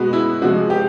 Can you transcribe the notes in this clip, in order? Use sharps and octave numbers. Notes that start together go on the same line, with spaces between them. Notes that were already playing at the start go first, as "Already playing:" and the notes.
Already playing: B2 G#3 B3 F#4
E4
C3 F3 G#3 F#4
G4